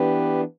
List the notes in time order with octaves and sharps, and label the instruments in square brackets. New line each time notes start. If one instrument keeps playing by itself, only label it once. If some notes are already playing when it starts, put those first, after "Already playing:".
Already playing: [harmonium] E3 B3 D4 G4 B4